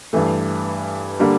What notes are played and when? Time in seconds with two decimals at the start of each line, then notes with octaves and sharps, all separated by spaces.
0.13 G2 E3 A3
1.20 D3 G3 A#3